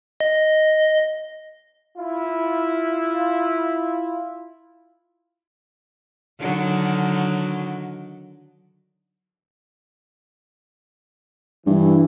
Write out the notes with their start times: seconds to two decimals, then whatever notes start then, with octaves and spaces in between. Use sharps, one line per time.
0.20 D#5
1.98 E4 F4
6.40 D3 D#3 F#3
11.67 G2 E3